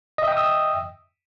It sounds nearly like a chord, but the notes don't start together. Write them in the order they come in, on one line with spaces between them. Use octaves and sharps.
D#5 E5 G5 D#6 E6